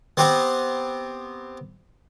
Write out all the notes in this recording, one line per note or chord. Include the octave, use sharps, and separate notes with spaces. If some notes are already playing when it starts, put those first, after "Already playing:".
B3 C4 G4 F#5